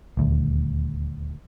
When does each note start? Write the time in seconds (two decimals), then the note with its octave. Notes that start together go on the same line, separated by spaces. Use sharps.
0.17 D#1 D2